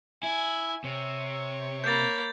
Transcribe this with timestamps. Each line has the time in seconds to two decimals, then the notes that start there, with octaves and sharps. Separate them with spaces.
0.23 E4 G#5
0.84 C3 C#5
1.84 A#3 B5 G6 A6